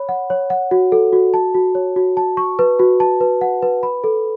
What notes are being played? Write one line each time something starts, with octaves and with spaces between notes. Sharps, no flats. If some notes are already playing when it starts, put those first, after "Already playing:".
Already playing: C#5 B5
F#5
C#5
F#5
F#4
A4
F#4
A5
F#4
C#5
F#4
A5
C#6
B4
F#4
A5
B4
F#5
B4
B5
A4